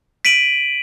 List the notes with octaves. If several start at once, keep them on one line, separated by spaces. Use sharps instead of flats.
B6 D7 D#7 F#7